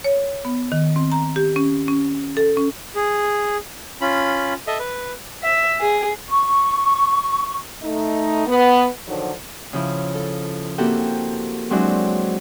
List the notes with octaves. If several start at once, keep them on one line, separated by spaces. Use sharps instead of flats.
C#5
B3
D#3
C4
A#5
G4
C#4
C#4
A4
C#4
G#4
C#4 F4 B5
A4 D#5 E5
B4
E5
G#4
C#6
A3 D#4
B3
D3 D#3 F3 F#3
C#3 F3 E4
A4
A#3 C4 E4 F#4 G4 A4
F#3 G#3 C4 D4 E4 F#4